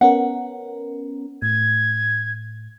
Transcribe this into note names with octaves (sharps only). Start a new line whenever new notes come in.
B3 C#4 A#4 F#5
A2 G#6